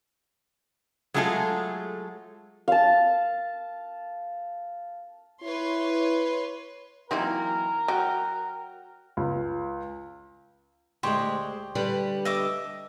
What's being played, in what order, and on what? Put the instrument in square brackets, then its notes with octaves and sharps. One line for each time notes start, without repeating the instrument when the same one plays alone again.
[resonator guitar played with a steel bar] F#3 G#3 A3 F4 G#4 A4
[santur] F5 A5
[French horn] E4 [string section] B4 C#5 C6
[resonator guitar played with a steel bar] E3 F#3 A#3 [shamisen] C4 D#4 E4 [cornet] A#4
[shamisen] F#3 [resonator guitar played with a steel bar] F#4 G5
[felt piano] C#2
[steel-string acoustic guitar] D2 G#3 [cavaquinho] G4 C5 C#5
[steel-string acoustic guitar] D3 G3 B4
[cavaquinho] D#5 E5 D6